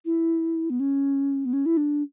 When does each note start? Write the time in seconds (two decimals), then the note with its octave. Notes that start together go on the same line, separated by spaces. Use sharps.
0.05 E4
0.70 B3
0.80 C#4
1.45 B3
1.53 C#4
1.66 E4
1.77 D4